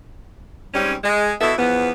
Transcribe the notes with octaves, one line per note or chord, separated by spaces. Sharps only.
G#2 G3 C4 C#4
G#3
B2 B3 E4 A4 E5
E2 F3 B3